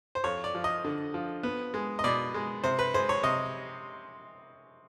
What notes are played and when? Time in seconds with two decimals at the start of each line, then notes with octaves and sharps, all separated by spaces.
0.15 C5
0.24 F2 C#5
0.44 D5
0.55 F3
0.64 D#5
0.84 D3
1.14 F3
1.43 B3
1.74 G#3
1.99 D#5
2.04 B2 D5
2.34 G#3
2.64 C3 C5
2.79 B4
2.94 G#3 C5
3.09 C#5
3.23 C3 D#5